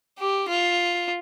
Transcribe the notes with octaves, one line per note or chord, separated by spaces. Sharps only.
G4
F4